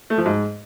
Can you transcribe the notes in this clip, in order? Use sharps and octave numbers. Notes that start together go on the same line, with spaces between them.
A3
F3
G#2